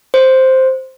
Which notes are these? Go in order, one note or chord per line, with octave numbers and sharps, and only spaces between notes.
C5